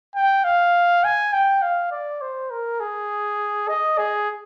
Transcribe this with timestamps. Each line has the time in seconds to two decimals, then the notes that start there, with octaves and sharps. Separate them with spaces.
0.15 G5
0.44 F5
1.04 G#5
1.33 G5
1.62 F5
1.91 D5
2.21 C5
2.51 A#4
2.80 G#4
3.68 D#5
3.98 G#4